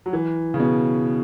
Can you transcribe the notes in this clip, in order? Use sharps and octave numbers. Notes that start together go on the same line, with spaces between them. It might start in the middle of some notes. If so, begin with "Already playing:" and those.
F#3
E3
C#3
B2